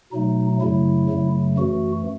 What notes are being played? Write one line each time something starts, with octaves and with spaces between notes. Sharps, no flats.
B2 F#3 A3 D#4
F#2 C#3 F#3 A3 E4
F#2 C#3 F#3 A3
F#2 E3 A3 F#4